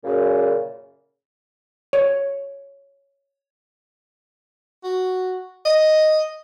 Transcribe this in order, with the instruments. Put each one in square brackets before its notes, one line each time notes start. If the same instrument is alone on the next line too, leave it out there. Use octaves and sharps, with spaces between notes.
[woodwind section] F#2 A#2 C#3
[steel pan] C#5
[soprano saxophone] F#4
D#5